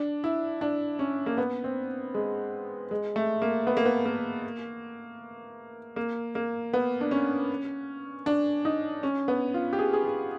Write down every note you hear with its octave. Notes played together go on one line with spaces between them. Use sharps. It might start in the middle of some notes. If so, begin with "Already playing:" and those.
Already playing: D4
E4
D4
C#4
A#3
B3
C4
G#3
G#3
A3
A#3
B3
A#3
B3
A#3
A#3
A#3
B3
D4
C#4
D4
D#4
C#4
B3
F4
G4
G#4
G#4
G4